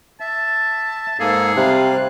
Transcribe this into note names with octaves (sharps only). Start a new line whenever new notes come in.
E5 A5
G#2 A#3 G#4 A4
C3 G3 F5 F#6